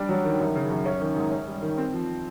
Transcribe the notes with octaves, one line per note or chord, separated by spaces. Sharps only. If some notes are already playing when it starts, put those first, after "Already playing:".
Already playing: G3 D4
F#3
D#3
F#2
C#3
F#2
C#4
D#3
G#2
C#4
G3
D#3
C4
F3